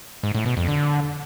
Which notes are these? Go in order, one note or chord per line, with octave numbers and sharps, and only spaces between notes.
G#2
A2
B2
F2
D3